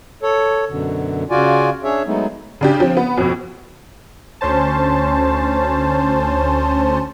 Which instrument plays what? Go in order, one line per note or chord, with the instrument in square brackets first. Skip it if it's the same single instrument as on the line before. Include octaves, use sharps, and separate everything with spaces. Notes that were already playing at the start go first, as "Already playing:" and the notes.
[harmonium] A4 C#5
F#2 B2 D3
C#3 F4 F#4 D5 G#5
C#4 D4 G#4 C#5 E5
F#3 G#3 A3 B3 D#4
[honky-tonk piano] C#3 D4 G4
F3 C4
B3
F2 B2
[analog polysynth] D2 C#4 C5 A5